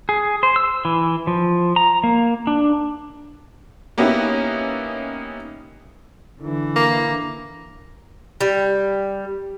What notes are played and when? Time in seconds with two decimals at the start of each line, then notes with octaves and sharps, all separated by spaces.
0.09 G#4
0.43 C5
0.56 E6
0.85 E3
1.27 F3
1.76 A#5
2.04 A#3
2.47 D4
3.98 A#3 B3 C#4 D#4 E4 G4
6.40 D3 E3
6.76 A#3
8.41 G3